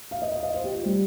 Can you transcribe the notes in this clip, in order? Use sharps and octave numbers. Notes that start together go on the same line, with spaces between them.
F5
D#5
F5
D#5
C5
G4
F4
G3